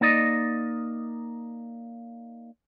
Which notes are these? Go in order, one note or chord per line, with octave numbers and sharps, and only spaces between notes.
A#3 D#4 D5 D#5